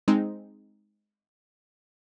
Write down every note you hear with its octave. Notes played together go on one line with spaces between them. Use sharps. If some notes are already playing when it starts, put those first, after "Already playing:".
G#3 C4 D#4